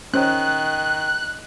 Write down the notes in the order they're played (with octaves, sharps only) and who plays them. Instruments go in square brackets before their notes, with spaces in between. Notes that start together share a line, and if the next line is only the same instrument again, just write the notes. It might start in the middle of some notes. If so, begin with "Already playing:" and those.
[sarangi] D#3 [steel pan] C#4 C5 [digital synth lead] F#6